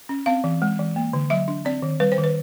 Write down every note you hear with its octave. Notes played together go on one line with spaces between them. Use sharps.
C#4
C4 F5
E3
G#3
E3
A#3
D3
F#3 E5
D4
C4 D5
D#3
G3 B4
C5
D#3
B4